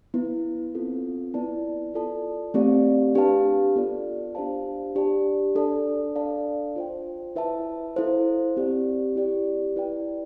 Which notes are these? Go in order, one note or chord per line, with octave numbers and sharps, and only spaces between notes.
B3 E4 B4
C4 F4 A4
B3 E4 B4 D5 A5
F4 A4 D5 A5
A3 C4 G4 D5 F5
D4 G4 B4 F5 A5
B3 F4 A4 D5
D4 G4 C5 F5 A5
D4 G4 D5 A5
D4 A4 D5 A5
D4 A4 D5 F5 A5
F4 C5 G5
E4 B4 E5 A5
E4 A4 C5 F5
C4 G4 D5
E4 G4 D5
E4 B4 D5 G5